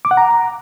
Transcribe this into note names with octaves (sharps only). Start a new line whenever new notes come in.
D6
F#5
A#5